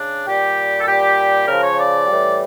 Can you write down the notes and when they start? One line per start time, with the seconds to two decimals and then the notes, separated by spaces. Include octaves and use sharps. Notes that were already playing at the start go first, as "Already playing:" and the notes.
Already playing: C#3 D4
0.27 A#2 G3 G4
0.81 A4
0.87 A#2 G3 G4
1.47 C#3 F3 A#4
1.62 C#5
1.77 D5
2.07 A2 E3 G3